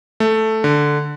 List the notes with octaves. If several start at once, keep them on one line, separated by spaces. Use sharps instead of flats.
A3
D3